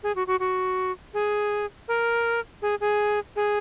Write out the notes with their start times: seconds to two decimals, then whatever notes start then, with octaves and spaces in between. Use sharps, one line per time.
0.03 G#4
0.16 F#4
0.27 F#4
0.40 F#4
1.14 G#4
1.88 A#4
2.62 G#4
2.80 G#4
3.36 G#4